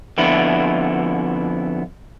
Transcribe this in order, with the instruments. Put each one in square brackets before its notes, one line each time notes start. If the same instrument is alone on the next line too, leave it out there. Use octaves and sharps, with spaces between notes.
[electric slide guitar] F2 D3 B3 E4